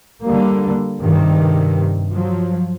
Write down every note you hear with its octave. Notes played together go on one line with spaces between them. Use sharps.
D3 G3 A#3
G2 C3 D#3
F3 F#3